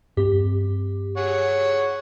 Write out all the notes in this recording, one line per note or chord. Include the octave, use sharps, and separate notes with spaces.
G2 C4 G4
G#4 C#5 F#5